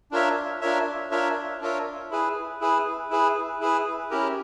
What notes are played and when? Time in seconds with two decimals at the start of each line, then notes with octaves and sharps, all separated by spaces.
0.11 D4 F4 A#4 C#5 E5
0.61 D4 F4 A#4 C#5 E5
1.11 D4 F4 A#4 C#5 E5
1.61 D4 F4 A#4 C#5 E5
2.11 E4 G#4 B4
2.60 E4 G#4 B4
3.10 E4 G#4 B4
3.60 E4 G#4 B4
4.11 C#4 E4 G4 A#4